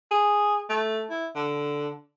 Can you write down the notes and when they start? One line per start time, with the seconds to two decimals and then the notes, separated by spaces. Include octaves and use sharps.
0.11 G#4
0.69 A3
1.10 E4
1.36 D3